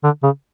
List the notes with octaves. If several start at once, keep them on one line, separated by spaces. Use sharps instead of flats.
D3
C#3